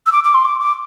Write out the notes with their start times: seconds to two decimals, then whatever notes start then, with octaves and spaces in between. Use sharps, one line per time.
0.06 E6
0.12 D6
0.24 D6
0.34 C6
0.45 D6
0.60 D6